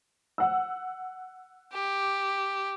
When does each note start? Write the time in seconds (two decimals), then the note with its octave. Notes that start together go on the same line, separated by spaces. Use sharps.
0.38 F#5 E6
1.73 G4